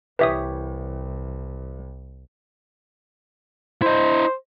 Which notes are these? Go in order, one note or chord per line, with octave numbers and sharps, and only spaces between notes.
C2 E3 G4 B4 C#5 E5 D#6
E4 C5 D#5